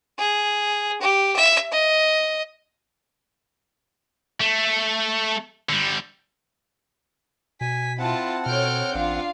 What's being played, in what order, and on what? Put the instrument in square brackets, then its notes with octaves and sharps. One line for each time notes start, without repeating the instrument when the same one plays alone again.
[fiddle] G#4
G4
E5
D#5
[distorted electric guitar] A3
D3 G3
[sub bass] B2 [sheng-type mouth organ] G#5 [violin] B6
[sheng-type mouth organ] C4 F#5 [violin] E4 F4 [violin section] A5
[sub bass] B2 [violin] A4 F6 [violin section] C#5 G6 D7
[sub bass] A1 [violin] D4 F4 [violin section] F5